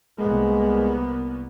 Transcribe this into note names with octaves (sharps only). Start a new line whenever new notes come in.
C2 G#3 A#3 B3